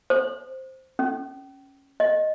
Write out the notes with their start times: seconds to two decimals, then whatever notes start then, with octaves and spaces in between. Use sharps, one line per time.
0.10 C5
0.99 C#4
2.00 D#5